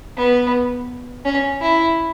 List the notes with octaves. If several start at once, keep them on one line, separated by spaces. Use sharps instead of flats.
B3
C#4
E4